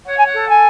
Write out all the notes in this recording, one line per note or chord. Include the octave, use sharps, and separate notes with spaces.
C#5 F#5
G#5
F#5
A4
G#5